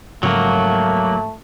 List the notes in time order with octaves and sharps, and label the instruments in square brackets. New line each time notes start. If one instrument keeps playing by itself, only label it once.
[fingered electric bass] G#2 C#3 F3 [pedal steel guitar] F#3 A#3 [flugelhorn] A3